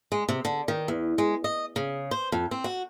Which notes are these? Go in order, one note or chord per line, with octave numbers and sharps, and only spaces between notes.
G#3
C3
D3
D#3
E2
G#3
D#5
C#3
C5
F2
C4
F#4